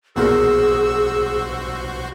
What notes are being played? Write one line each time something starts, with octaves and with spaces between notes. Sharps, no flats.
B1 E2 A#2 F#4 G#4 A#4 C5 E6